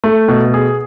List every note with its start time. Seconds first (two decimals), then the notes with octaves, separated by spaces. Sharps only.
0.04 A3
0.28 B2
0.54 G#4